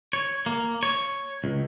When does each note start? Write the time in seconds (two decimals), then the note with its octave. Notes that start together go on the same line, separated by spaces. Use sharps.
0.13 C#5
0.46 A#3
0.83 C#5
1.44 C#2